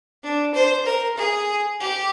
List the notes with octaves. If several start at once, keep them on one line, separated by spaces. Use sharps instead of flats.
D4
C5
A#4
G#4
G4